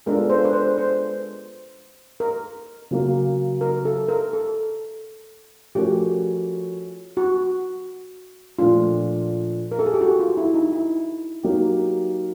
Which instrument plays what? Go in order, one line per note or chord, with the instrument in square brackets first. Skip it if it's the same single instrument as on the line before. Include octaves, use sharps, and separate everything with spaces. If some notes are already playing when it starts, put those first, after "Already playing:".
[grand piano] G#3 B3 D4 F4 A4 [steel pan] A#4
[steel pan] C5
B4
C5
C5
A#4
[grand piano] C#3 F#3 A#3
[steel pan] A#4
A4
A#4
A4
[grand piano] F3 A3 C#4 F#4 A#4 [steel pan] G4
[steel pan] F#4
[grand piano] A#2 F3 A3 D4 [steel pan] F4
[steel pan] A#4
A4
G#4
G4
F#4
F4
E4
D#4
E4
[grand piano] F#3 A#3 D#4 G4